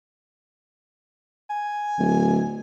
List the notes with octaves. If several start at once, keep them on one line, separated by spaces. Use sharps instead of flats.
G#5
D1